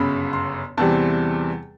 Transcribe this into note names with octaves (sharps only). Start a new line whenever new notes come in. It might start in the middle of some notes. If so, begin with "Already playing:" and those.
Already playing: G1 F#2 C#3 B5
C6
E2 C3 E3 G3 C4 A5